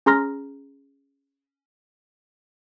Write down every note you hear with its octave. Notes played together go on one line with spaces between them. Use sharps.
C#4 G#4 A#5 C6 F6 A#6